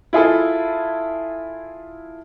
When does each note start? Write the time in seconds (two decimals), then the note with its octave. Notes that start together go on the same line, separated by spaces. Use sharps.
0.13 E4 F4 G#4 A4